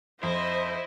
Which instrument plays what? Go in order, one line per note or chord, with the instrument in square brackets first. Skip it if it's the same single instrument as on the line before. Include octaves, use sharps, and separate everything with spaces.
[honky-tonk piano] F2 [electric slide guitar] E4 [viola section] C5 [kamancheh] D#5